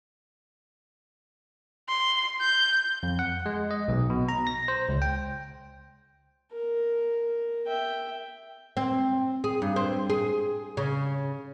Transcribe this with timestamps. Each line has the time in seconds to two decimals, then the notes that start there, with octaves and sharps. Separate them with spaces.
1.89 C6
2.40 G6
3.03 F2
3.19 F#5
3.46 G#3
3.71 D#5
3.88 B1
4.10 B2
4.29 A#5
4.47 A#6
4.68 C5
4.89 C#2
5.02 G5
6.52 A#4
7.67 E5 G5
8.77 C4
9.44 G#4
9.62 G2
9.76 C4
10.10 G#4
10.77 C#3